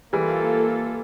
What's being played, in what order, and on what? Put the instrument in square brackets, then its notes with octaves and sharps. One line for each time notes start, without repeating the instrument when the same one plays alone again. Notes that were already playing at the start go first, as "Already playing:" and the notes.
[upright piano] E3 G3 [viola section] A#3 F4 A4